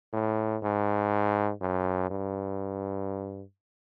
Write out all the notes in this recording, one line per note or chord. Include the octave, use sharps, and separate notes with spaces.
A2
G#2
F#2
G2